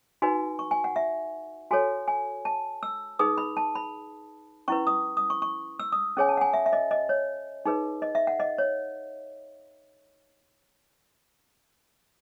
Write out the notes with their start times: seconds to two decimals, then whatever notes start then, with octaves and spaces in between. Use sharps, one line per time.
0.22 D#4 F#4 B4 G#5
0.59 C#6
0.71 G#5
0.84 F#5
0.96 E5
1.71 F#4 A4 C#5 G#5
2.08 G#5
2.45 A5
2.83 E6
3.19 D#4 G#4 B4 D#6
3.38 B5
3.57 A5
3.75 B5
4.68 C#4 E4 B4 C#6
4.87 D#6
5.17 D#6
5.30 C#6
5.42 C#6
5.79 E6
5.92 D#6
6.17 C#4 G#4 C#5 G#5
6.29 A5
6.37 F#5
6.41 G#5
6.53 E5
6.66 E5
6.73 D#5
6.91 D#5
7.09 C#5
7.65 D#4 G#4 B4
8.02 D#5
8.15 E5
8.27 F#5
8.40 D#5
8.58 C#5